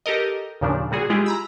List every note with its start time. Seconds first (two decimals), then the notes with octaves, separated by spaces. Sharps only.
0.06 G4 A4 A#4 D#5
0.61 D#2 A#2 C#3 F3 D4
0.91 A#2 G3 F#4 G#4
1.10 G#3 E4 F4 G4 G#4
1.26 A#5 B5 E6